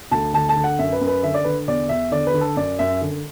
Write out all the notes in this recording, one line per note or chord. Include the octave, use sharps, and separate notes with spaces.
D2 A5
D3 A5
A5
D3
F#5
F#2 E5
B4
F#2
B4
D3 E5
D5
D3 B4
E2 D5
E2 E5
D3 D5
B4
D3
A4
F#2 D5
F#2 E5
D3